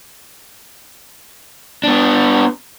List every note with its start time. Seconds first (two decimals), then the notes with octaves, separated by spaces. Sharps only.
1.84 B3 D4